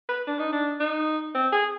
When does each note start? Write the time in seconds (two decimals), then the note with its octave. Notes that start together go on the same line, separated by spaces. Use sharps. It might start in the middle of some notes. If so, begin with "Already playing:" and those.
0.08 B4
0.27 D4
0.39 D#4
0.52 D4
0.80 D#4
1.34 C4
1.52 G#4